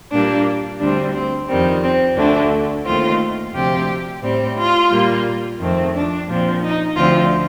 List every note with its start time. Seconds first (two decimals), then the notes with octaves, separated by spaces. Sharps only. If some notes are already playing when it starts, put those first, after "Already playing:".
0.11 A#2 G3 A#3 D4
0.80 D2 D3 G3 C4 D4
1.14 C4
1.49 F2 D#3 G3 C4
1.83 C4
2.16 D2 D3 A3 D4
2.85 D#2 D#3 A3 C4 F4
3.53 D2 C3 F3 C4 G4
4.22 A2 G3 C4
4.56 F4
4.91 A#2 G3 A#3
5.60 F2 D#3 A3 C4
5.94 D4
6.27 A#2 F3 C4
6.62 D#4
6.96 D2 D3 F3 C4 F4